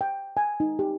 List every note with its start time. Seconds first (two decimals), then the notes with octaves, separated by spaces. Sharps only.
0.01 G5
0.37 G#5
0.60 D#4
0.79 G4